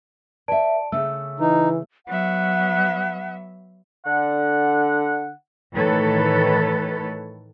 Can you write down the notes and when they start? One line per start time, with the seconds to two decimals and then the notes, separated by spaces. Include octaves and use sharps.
0.48 B4 D5 E5 A5 D7
0.92 C#3 A3 E6
1.40 E3 D#4
2.07 F#3 B3 E5 F#5
4.06 D3 F#5
5.74 A2 D#3 E3 A4 B4 C#5